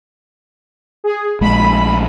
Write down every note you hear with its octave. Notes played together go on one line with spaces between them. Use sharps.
G#4
A#1 G#3 A3 B5